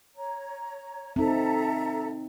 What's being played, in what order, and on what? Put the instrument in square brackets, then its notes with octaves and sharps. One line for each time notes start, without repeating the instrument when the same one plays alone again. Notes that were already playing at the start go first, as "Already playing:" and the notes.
[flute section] C#5 A#5
[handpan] C4 D#4 [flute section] A4 E5 A#5